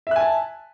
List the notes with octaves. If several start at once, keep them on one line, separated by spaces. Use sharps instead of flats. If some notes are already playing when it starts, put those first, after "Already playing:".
E5 G#5 A5 F#6